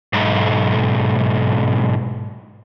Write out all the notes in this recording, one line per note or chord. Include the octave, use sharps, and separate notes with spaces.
B1 G#2